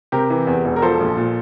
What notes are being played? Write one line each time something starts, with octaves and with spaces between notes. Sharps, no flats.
C3 G4 A#4
E3
E2
E1
A#4
F3 A4 C5
A#1
A#2